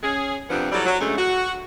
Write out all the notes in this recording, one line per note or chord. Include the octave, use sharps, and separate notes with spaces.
C#4 G#4
F2 C3 F3 B3 C4 D4
E3 F#3 G3 E4 A4 D5
F#3
F#2 D3 G#3 A3
F#4